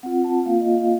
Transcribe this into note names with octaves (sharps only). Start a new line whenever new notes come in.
C4 F4 F#5
A5
A#3 F4 F5
D#5
F5